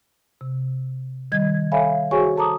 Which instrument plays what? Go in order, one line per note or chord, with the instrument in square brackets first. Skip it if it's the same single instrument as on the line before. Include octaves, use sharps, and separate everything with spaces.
[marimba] C3
D#3 G3 D#5 G#6
A4 C#5 E5 F5 G#5 B5
F#4 G#4 C5 C#5 G#5 C#6
A4 A5 A#5 D6 D#6